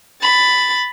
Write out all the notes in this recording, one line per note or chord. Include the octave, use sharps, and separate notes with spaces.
B5 A6